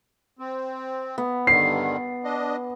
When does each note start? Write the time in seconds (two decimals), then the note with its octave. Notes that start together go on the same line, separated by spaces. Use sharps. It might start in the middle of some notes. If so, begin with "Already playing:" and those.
0.39 C4
1.18 B3
1.47 G2 D3 D#3 C7
2.24 D4 D#5